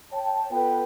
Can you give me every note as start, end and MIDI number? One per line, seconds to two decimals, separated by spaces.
0.12 0.45 73
0.12 0.45 79
0.12 0.45 81
0.51 0.83 59
0.51 0.83 65
0.51 0.83 69
0.51 0.83 71
0.51 0.83 79